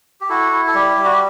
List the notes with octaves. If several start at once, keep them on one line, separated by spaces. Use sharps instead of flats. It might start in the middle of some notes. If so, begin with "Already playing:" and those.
G4
E4 F#4 A4
E4
A4
G3 G4
G3
F#4
G4